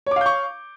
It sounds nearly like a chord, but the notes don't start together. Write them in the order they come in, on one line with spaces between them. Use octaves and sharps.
C#5 D6 F5 G6 C#6